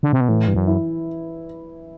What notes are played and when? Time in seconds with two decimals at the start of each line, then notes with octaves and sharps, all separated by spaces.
0.03 D3
0.13 C3
0.21 B2
0.29 A2 E3
0.47 G2
0.54 F#2
0.67 E4